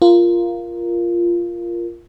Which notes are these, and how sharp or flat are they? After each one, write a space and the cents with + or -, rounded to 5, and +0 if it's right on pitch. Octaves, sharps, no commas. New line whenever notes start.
F4 -10 A#4 +5